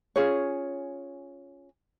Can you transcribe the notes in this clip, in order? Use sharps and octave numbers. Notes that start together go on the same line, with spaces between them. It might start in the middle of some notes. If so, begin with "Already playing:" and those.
C#4 F4 G#4 C#5